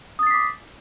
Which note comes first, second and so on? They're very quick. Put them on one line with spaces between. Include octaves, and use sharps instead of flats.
D#6 A6 C7 B6 D6